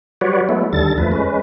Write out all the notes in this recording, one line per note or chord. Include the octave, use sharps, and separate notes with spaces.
F#3 G3 F#4 B4 C#5 D5
F#3 G#3 A3 B3 E4
D#2 D3 G3 A4 A6
F2 F3 A3 B4
G#3 C#4 B4